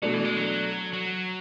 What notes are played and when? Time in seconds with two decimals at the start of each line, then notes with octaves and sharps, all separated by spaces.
0.02 B2 F#3 A3 D4
0.14 E3
0.25 G#3
0.37 F#3
0.93 F#3